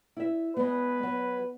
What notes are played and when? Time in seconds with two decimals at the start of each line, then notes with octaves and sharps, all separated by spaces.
0.17 E4 E5
0.57 G#3 B3 B4
1.03 F#3